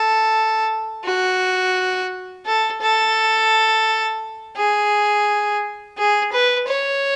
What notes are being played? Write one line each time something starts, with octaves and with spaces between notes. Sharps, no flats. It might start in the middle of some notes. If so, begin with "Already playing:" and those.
Already playing: A4
F#4
A4
A4
G#4
G#4
B4
C#5